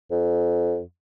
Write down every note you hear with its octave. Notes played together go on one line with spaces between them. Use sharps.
F2